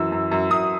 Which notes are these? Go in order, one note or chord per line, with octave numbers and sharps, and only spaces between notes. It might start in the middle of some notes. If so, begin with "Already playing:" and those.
Already playing: F#2 E3 E6
F#2
F#2
F#2 D#6